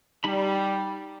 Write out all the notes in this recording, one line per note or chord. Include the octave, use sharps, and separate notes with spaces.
G3 D#4 A5 B5